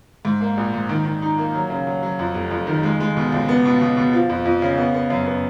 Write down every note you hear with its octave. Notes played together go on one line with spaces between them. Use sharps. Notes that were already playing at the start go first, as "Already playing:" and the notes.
G#2
A#3
A#1
G#2
D#3
D#3
D#4
A#3
F#3
C#3
F#3
F#3
F2
F1
F2
D#3
G#3
G#3
B2
C#2
B3
B2
B2
B2
F3
F2
F2
C#3
B3
B3
F#2
B3